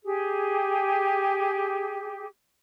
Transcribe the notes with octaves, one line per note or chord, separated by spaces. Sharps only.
G4 G#4